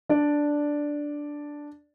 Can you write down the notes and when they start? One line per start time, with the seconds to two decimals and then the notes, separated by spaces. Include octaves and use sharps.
0.09 D4 D5